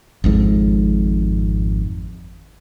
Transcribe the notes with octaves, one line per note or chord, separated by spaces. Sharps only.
G#1 F2 G#2